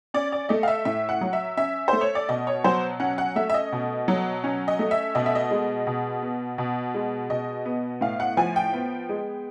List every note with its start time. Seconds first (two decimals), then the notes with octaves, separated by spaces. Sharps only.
0.14 C#4 D5
0.32 D5
0.49 A3 D#5
0.63 F5
0.68 E5
0.85 A2 E5
1.09 F#5
1.21 F#3
1.33 E5
1.57 C#4 E5
1.88 A3 C5
2.01 C#5
2.15 D5
2.29 B2 D#5
2.47 C#5
2.64 F#3 C5
3.00 C#4 F#5
3.18 F#5
3.36 A3 E5
3.50 E5
3.54 D#5
3.72 B2
4.08 F#3
4.44 C#4
4.68 D#5
4.79 A3
4.91 E5
5.15 B2 D#5
5.26 E5
5.35 D#5
5.51 G#3
5.87 B2
6.22 B3
6.58 B2
6.94 G#3
7.30 B2 D#5
7.65 B3
8.01 A2 F5
8.20 F#5
8.37 F3 G#5
8.56 G5
8.73 B3
9.09 G#3